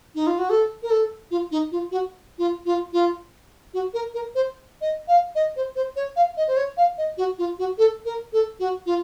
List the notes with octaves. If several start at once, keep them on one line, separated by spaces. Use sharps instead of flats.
D#4
F4
F#4
A4
A#4
A4
F4
D#4
F4
F#4
F4
F4
F4
F#4
A#4
A#4
C5
D#5
F5
D#5
C5
C5
C#5
F5
D#5
C5
C#5
F5
D#5
F#4
F4
F#4
A4
A#4
A4
F#4
F4